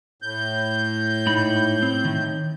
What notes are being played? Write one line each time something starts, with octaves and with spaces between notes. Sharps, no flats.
A2 G6
G#2 D#4 B5
C4
D#3